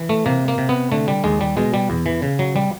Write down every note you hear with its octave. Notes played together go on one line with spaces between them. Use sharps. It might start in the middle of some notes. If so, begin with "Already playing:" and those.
Already playing: E3
A3
C3 A#3
A#3
C3
B3
D3 A3
G3
D#2 G#3
G3
B2 G#3
G3
E2
E3
C#3
F#3
G3